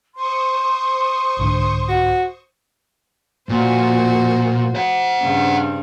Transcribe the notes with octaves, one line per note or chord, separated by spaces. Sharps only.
C5 C6 C#6 D#6
C2 G#2 D3
F#4
F2 A#2 F#4 C5
C5 F#5
G2 C#3 C4